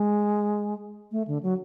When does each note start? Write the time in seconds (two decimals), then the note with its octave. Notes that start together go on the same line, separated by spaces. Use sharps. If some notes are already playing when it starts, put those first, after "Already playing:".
Already playing: G#3
1.12 A3
1.27 D3
1.43 F#3